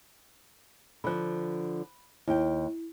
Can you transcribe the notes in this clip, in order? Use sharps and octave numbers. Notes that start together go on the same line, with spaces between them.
D3 F3 B5 F#6
D#2 E4 G5